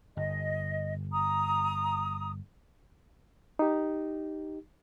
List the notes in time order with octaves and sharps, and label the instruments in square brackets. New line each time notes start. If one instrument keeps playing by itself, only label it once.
[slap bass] G1 [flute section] D#5
[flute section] A#5 D#6
[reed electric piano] D#4 G4